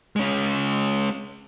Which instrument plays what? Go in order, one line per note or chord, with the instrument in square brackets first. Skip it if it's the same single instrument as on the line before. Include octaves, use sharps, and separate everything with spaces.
[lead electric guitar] G#3 C#4